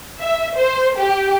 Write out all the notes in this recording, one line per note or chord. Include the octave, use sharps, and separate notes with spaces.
E5
C5
G4